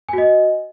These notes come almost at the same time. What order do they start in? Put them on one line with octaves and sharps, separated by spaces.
G#5 F#4 D#5